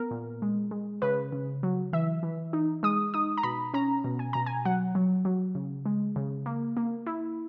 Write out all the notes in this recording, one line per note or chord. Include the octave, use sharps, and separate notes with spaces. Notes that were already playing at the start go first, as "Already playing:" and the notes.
Already playing: B3 A#4
A#2
G#3
G#3
C#3 B4
C#3
F#3
E3 E5
E3
D#4
G#3 D#6
D#4 D#6
A#5
B2 B5
C#4 A#5
B2
G#5
B2 A#5
G#5
F#3 F#5
F#3
F#3
C#3
G#3
C#3
A#3
A#3
E4